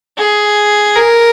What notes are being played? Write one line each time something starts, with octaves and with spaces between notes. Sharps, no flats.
G#4
A#4